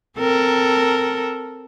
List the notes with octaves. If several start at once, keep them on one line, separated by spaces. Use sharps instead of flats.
C4 A4 A#4